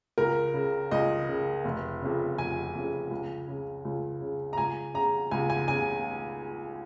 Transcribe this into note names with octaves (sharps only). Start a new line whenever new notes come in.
C#2 A#4
C#3
C#2 D#5
C#3
F1
F2 C#3
F1 G#5
F2 C#3
C#2
C#3
C#2
C#3
A#5
C#2 G#5
C#3 A#5
C#2 G#5
G#5
C#3 G#5